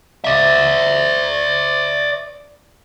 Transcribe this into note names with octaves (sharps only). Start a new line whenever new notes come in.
D5 E5